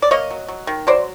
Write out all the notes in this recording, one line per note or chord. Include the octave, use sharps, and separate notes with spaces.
D5
A#3 C#5 D#5
F#3
F#3
D#3
F#3 C5 D5